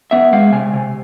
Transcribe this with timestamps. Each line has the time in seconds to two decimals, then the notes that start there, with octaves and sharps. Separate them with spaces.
0.11 B3 E5
0.33 G#3 F5
0.53 C3 G#5
0.74 C3